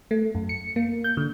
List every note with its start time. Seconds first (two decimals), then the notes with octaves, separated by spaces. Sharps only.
0.11 A3
0.35 F#2
0.49 C#7
0.76 A#3
1.04 G6
1.17 D3